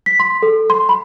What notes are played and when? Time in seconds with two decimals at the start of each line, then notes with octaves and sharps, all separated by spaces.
0.06 B6
0.20 C6
0.42 A4
0.70 C6
0.89 B5